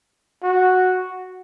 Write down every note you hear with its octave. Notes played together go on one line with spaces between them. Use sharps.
F#4